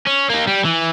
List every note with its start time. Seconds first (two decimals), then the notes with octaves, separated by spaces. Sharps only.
0.07 C#4
0.30 A#3 D#4
0.47 G3
0.65 E3